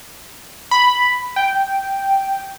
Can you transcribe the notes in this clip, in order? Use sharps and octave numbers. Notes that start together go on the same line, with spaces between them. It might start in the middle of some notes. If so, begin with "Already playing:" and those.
B5
G5